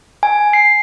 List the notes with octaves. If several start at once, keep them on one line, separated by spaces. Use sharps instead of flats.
G#5
C7